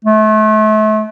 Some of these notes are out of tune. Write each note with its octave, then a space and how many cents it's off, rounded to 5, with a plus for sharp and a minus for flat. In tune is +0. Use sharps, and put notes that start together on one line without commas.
A3 -35